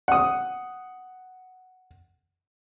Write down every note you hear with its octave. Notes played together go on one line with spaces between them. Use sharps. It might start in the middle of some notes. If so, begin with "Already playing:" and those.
F#5 D#6